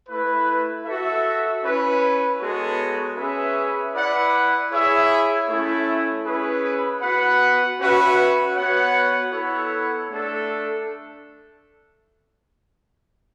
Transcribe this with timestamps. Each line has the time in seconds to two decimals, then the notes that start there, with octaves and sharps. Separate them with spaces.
0.09 A3 E4 B4
0.86 F#4 A4 E5
1.62 C#4 E4 B4
2.40 G#3 B3 F#4 A4 C#5
3.16 C#4 G#4 B4 E5
3.93 E4 B4 D5 F#5
4.71 E4 G#4 C#5 E5
5.47 A3 C#4 E4
6.24 C#4 E4 G#4 B4
7.01 B3 F#4 B4 F#5
7.78 C#4 F#4 B4 E5
8.56 B3 F#4 C#5 F#5
9.32 B3 E4 A4 C#5 F#5
10.10 A3 D4 A4